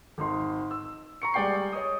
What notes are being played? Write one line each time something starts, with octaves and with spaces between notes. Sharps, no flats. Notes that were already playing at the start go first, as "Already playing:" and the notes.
G#1 D#4 C6
E6
A#5 C#6 C#7
G3 G#3 D5 G5 G6 C7
C#5 D#5 D#6